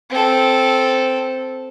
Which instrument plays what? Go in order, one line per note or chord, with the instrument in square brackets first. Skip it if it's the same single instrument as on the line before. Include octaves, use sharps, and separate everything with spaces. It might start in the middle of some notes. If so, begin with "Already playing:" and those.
[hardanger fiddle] C4 A4